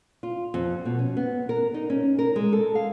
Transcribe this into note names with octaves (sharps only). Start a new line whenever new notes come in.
F4
F2
B2
C#4
B3
A#4
D#4
C#4
A#4
G#3
A4
F5